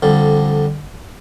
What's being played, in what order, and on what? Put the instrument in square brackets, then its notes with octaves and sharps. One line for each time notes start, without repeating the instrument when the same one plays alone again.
[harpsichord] F2 D3 G3